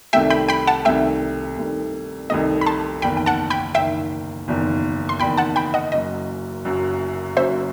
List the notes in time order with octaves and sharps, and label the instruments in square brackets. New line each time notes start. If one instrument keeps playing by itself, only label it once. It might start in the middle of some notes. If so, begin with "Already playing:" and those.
[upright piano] C2 C3 D#3 A3 [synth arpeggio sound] E5 G5
[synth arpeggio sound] G5 B5
G5 B5
F#5 A5
[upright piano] C2 C3 D#3 A3 [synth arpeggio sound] E5 G5
[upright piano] C2 C3 D#3 A3
[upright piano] C2 C3 D#3 A3 [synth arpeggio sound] D#5
[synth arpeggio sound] B5
A5 C6
[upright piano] F#1 E2 D#3 [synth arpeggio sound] G5 B5
[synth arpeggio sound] G5
F#5 A5
G5 B5
[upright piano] F#1 E2 D#3 [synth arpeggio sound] E5 G5
[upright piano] F#1 E2 D#3
[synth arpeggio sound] C6
[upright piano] F#1 E2 D#3 [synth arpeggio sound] G5 B5
[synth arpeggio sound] F#5 A5
G5 B5
D#5 F#5
[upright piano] F#1 F#2 F#3 [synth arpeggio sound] D#5
[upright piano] F#1 F#2 F#3
[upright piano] F#1 F#2 F#3 [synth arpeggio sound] C5 E5